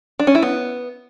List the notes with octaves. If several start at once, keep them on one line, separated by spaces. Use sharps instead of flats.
D4
C#4
E4
B3